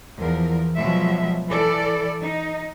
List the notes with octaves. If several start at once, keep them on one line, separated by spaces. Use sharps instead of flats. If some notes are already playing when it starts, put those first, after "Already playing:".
E2 F3 A#4
B2 F3 F#3 G#3 E5
E3 A4 D5
D#4